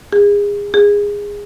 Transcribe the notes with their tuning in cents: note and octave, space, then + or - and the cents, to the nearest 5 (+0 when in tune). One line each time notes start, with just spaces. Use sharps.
G#4 -30
G#4 -20